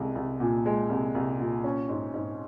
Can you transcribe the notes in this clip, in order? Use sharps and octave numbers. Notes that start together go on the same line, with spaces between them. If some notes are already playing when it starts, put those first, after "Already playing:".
Already playing: C2 G#3
C2
A#2
G#3
C2
C2
A#2
C#4
G#2
G#2